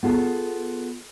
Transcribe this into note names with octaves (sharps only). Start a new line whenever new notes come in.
B3 F4 G#4 A4